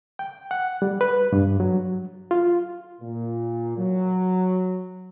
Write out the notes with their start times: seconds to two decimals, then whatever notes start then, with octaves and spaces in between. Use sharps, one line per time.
0.19 G5
0.51 F#5
0.82 G3
1.01 B4
1.33 G2
1.60 F#3
2.31 F4
3.01 A#2
3.77 F#3